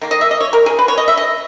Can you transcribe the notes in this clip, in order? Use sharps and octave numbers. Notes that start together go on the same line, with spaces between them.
D#3 A#3
D#5
E5
D#5
C#5
A#4
G#4
B4
C#5
D#5
E5
D#5